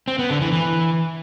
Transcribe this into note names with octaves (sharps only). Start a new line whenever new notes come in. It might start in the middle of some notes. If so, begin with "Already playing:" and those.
C4
B3
D3
E3
E3